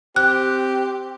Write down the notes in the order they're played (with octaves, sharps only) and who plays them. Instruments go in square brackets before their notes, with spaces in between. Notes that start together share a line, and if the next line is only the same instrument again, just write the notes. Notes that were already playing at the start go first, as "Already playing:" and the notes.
[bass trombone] C4 [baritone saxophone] G4 [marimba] F#6